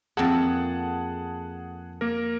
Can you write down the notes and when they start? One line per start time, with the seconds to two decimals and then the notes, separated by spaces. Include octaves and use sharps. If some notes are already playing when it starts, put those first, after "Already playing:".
0.17 F2 A#3 G#4 A4 F#5 A5
2.01 A#3 A#4